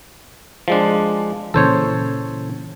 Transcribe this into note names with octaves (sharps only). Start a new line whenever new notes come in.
F3 G#3 D4
A#2 C#3 E3 A4 C5 C#5